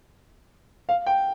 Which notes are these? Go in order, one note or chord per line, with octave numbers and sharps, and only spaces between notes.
F5
G5